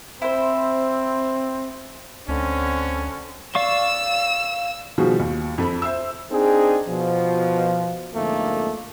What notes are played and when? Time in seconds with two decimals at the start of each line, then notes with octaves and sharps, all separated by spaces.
0.22 C4 E4 C5
2.28 D2 D3 C4 C#4
3.55 D5 F5 C#6 E6 E7
4.98 B2 D#3 F3 G3 F#4 G#4
5.19 D#2
5.58 F2 A4 B5
5.82 C5 E5 E6
6.32 C4 D4 D#4 G#4
6.88 B2 F3
8.15 F2 G#2 D3 A3 A#3